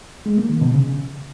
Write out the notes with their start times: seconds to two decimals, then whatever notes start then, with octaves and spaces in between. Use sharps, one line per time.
0.26 G#3
0.38 A#3
0.49 D#3
0.61 B2
0.73 C#3